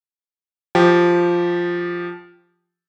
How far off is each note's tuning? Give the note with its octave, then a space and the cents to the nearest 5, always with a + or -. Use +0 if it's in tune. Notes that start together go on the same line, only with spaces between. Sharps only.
F3 +0 G4 +0